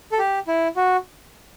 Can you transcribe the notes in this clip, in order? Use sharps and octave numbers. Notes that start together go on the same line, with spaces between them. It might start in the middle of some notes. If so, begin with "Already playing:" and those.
A4
G4
E4
F#4